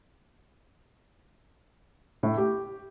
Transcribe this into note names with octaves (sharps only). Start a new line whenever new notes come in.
A2
G4